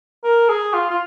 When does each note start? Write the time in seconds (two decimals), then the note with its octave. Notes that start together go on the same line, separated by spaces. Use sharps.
0.24 A#4
0.49 G#4
0.74 F4
0.91 F4